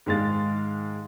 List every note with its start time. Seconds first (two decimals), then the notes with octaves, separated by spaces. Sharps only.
0.06 G#2 D#3 G#3 F5 A6